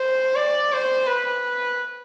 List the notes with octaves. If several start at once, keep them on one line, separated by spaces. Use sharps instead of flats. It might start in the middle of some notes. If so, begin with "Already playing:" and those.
Already playing: C5
D5
C5
B4